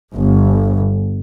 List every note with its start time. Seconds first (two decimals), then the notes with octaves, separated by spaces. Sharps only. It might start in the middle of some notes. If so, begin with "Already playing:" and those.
0.14 G1